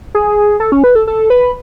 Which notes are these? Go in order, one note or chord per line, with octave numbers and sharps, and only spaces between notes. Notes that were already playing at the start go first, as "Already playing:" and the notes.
G#4
A4
C#4
B4
A4
A4
B4